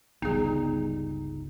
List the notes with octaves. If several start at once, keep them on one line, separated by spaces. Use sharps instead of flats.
G1 C#2 G3 B3 D#4 G#4